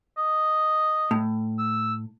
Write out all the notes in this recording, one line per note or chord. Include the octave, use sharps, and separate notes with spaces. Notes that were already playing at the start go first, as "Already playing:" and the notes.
D#5
A2
E6